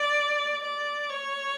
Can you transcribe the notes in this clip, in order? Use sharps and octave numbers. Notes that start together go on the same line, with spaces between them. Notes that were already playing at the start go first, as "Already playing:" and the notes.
Already playing: D5
D5
C#5